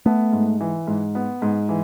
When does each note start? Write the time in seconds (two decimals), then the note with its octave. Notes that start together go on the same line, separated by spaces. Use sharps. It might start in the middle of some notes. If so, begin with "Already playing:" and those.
0.06 A3 B3
0.32 G#2
0.61 E3
0.87 G#2
1.15 B3
1.42 G#2
1.69 E3